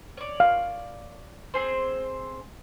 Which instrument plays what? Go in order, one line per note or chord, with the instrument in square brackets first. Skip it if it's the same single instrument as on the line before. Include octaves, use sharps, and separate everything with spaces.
[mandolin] C#5 D5
[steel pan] F5
[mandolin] C4 G#4 C5